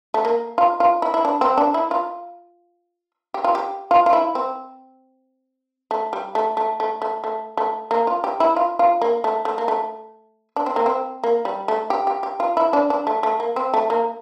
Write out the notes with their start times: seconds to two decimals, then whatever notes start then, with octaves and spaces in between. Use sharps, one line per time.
0.14 A3
0.25 A#3
0.58 F4
0.80 F4
1.02 E4
1.14 E4
1.25 D4
1.41 C4
1.58 D4
1.74 E4
1.91 F4
3.34 G4
3.44 F4
3.55 G4
3.91 F4
4.06 F4
4.13 E4
4.35 C4
5.91 A3
6.13 G3
6.35 A3
6.57 A3
6.80 A3
7.02 A3
7.24 A3
7.57 A3
7.91 A#3
8.07 F4
8.24 G4
8.40 E4
8.56 F4
8.79 F4
9.02 A#3
9.24 A3
9.45 A3
9.58 A#3
9.68 A3
10.56 D4
10.66 C4
10.76 A#3
10.86 C4
11.24 A#3
11.45 G3
11.68 A3
11.90 G4
12.07 G4
12.23 G4
12.40 F4
12.57 E4
12.73 D4
12.90 D4
13.07 A3
13.23 A3
13.40 A#3
13.56 C4
13.74 A3
13.90 A#3